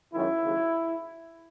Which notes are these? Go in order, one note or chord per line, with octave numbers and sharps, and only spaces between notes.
F#2 D#3 G#3 E4
D#2 C#3 F#3